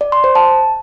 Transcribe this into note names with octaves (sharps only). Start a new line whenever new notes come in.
D5
C6
C5
A5